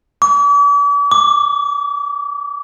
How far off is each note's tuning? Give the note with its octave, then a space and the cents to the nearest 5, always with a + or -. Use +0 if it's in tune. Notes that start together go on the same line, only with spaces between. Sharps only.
D6 -45
D6 +5